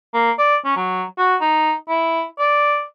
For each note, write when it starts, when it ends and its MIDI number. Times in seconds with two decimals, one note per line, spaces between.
0.14 0.31 58
0.38 0.56 74
0.65 0.75 61
0.76 1.03 54
1.18 1.35 66
1.41 1.73 63
1.89 2.24 64
2.38 2.83 74